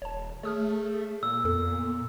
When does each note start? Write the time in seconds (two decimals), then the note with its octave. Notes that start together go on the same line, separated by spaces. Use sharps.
0.02 D#1 C#5 A5
0.43 A3 G#4 C#5 D#6 F6
1.23 A#2 E6
1.45 F2 B3 A4